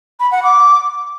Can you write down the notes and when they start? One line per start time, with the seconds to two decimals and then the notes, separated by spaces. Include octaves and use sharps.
0.20 B5
0.31 F#5
0.43 D6